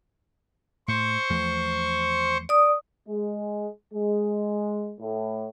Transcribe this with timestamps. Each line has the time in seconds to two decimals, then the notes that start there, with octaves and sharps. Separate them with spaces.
0.88 A2 C5 C#6
1.30 E2 F3 A3
2.49 D5 D#6
3.08 G#3
3.93 G#3
5.00 A2